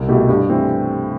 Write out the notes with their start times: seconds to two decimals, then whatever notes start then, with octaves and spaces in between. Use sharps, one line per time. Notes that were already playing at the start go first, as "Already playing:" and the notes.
Already playing: C2
0.09 B2 A3 E4 G4
0.29 G2
0.49 E3 A3 C4